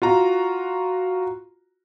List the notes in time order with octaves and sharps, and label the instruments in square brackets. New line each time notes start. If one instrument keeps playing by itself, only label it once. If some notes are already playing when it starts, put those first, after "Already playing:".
[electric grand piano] F4 F#4 A#5